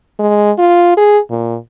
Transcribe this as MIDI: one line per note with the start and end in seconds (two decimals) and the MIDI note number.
0.20 0.52 56
0.58 0.92 65
0.97 1.19 68
1.30 1.57 46